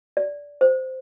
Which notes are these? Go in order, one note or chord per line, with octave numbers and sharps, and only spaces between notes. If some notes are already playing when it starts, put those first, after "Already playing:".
D5
C5